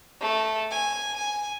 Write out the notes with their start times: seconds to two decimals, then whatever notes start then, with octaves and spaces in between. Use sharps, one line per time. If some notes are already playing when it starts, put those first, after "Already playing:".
0.21 A3
0.71 G#5
1.17 G#5